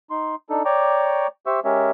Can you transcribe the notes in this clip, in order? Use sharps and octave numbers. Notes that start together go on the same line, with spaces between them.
D#4 C6
D4 D#4 A4
C#5 D5 G5 A#5 C#6 D6
G4 C5 E5 C#6 E6
G#3 C#4 G4 A#4 C#5 E5